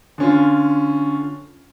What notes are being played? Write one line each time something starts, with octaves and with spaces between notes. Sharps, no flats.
D3 C#4 F4